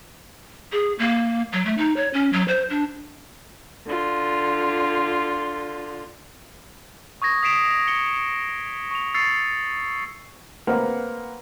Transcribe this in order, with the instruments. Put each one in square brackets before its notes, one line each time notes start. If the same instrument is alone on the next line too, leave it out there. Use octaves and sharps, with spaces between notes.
[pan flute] G#4
A#3
F#3
A3
D#4
C#5
C#4
F#3
C5
D4
[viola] D3 F4
[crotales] C#6 D#6 G#6 A#6
D#6 B6 C7 D7 E7 F7
D#6 C#7 G7
C#6 F7
C#6 E6 A6 C7 C#7 F7
[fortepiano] A#3 C4 A#4 B4 F#5 A#5